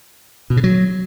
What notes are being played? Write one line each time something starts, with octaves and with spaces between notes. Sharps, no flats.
B2
C#3
F#3